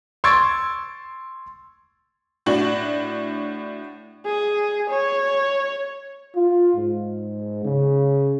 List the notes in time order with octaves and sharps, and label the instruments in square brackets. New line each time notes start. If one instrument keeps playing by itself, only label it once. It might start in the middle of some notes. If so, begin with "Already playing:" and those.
[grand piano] C6 C#6 E6 G#6 A6 D7
[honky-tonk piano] A2 D4 F#4
[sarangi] G#4
C#5
[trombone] F4
G#2
C#3